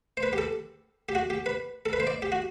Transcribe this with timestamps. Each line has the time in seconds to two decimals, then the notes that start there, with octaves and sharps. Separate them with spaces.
0.17 C5
0.23 B4
0.33 G4
0.38 A4
1.09 G4
1.15 F#4
1.30 G4
1.46 B4
1.86 A4
1.93 B4
2.00 C5
2.07 D5
2.22 G4
2.32 F#4